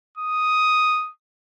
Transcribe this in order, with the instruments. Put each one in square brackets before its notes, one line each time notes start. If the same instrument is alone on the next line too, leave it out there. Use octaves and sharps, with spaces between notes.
[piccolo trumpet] D#6